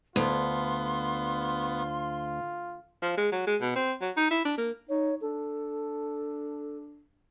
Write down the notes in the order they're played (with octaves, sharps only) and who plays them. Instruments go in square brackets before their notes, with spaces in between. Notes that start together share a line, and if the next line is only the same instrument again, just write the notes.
[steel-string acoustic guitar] D2 [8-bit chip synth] B3 [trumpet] F4 [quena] C6
[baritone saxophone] F3
G#3
F#3
G#3
B2
C4
F#3
D#4
E4
D4
A#3
[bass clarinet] D#4 [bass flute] C#5
[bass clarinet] D4 [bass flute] A4